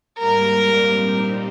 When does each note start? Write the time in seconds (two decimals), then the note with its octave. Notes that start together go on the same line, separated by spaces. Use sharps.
0.17 G#2 G3 A#3 A#4
0.74 A#2 G3 C4 D#4 G4